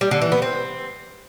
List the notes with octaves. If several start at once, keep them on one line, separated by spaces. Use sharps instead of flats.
G3
D3
E3
B3
C4